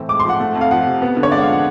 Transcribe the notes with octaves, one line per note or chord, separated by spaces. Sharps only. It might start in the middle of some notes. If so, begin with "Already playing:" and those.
Already playing: A2 E3 C4
G#3 D6
C6
F3 F#5
A3
F2
F5
F3 F#5
C3
B3
D3
C#5
G#3 D5
F#5
F5
F3
F#5